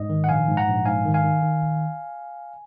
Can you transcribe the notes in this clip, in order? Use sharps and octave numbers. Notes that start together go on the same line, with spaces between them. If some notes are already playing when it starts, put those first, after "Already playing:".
Already playing: G#2 D#5
D#3
F#5
A#1 F5 G#5
G#2
F#5 A#5
A#1
G#2 F5 G#5
D#3
F5 G#5
D#3
D#3
A#1